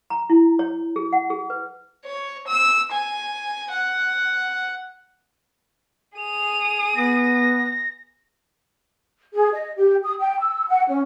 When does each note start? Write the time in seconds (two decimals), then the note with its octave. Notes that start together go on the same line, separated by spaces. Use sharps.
0.10 A#5
0.30 E4
0.59 C#5
0.96 G#4
1.13 F#5
1.30 G#4
1.50 B4
2.05 C#5
2.47 E6
2.92 G#5
3.71 F#5
6.18 G#4 D#6 F7
6.96 B3 A#6
9.34 G#4
9.53 D#5
9.77 G4
10.04 D#6
10.20 G5
10.39 E6
10.68 F#5
10.88 C#4